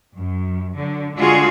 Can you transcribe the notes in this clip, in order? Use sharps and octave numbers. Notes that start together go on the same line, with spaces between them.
F#2
D3 F#3
D3 G#3 F4 F#4 G#4